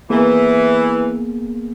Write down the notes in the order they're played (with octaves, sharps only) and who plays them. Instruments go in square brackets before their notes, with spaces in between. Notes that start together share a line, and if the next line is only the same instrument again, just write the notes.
[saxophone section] E3 [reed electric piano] A#3 B3 G#4